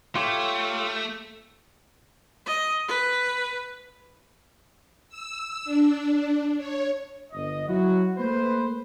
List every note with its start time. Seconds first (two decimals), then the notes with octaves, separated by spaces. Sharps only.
0.15 A3 F4 G4 C#5
2.46 D#5
2.88 B4
5.09 E6
5.65 D4
6.57 C#5
7.32 G1 D#5
7.68 F#3 E4 F#4
8.18 A3 A#3 B4 C5